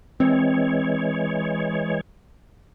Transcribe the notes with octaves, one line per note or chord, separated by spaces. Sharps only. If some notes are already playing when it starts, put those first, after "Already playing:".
E3 G#3 C4 C#5